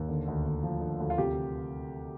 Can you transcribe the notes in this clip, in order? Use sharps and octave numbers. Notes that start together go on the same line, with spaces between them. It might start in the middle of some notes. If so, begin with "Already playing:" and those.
Already playing: D#2
D3
D2
D2
F3
D3
D2
F4
C3 G4